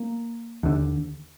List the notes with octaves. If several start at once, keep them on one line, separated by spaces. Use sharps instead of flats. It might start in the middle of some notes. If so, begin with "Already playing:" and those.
Already playing: A#3
D#2 D3